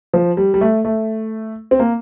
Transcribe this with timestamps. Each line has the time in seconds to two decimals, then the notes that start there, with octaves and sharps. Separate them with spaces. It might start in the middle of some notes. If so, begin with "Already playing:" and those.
0.14 F3
0.37 G3
0.54 G3
0.61 A3
0.85 A3
1.71 C4
1.80 A#3